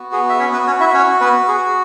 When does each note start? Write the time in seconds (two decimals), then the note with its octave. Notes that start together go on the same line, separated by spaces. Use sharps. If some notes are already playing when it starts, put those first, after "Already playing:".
Already playing: B3 F#4
0.12 G#4
0.29 E5
0.40 C#4 C#5
0.53 B3 B4
0.67 C#4 C#5
0.80 E4 E5
0.94 C#4 C#5
1.21 B3 B4
1.48 G#4